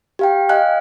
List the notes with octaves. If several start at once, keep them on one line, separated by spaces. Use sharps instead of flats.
G4 F5 G5
D#5 F5 G#5 F#6